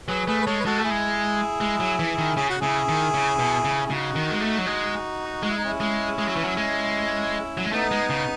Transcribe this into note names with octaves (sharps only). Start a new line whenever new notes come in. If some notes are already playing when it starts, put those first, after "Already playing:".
F#3 G#4 B4
A3 G#4 B4
B4
G#3 A4 C#5
B4
G#3 F#4 A4
A3
E4 G#4
G#3
G#3
F#3
E3
D#3
C#3 G#4
F#4
C#3 E4 G#4
D#3
C#3
B2
C#3
G#4
C#3 D#4 F#4
D#3
G#3
A3
F#3
G#3
G#3 F#4
E4
D#4
C#4 E4
G#3
G#3
F#3
E3
F#3
G#3
F#3
G#3
A3 B3 D#4
G#3
C#3